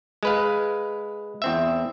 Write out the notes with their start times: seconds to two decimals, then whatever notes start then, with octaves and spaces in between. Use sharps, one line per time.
0.23 G#3 B4 F5
1.42 E2 C4 E5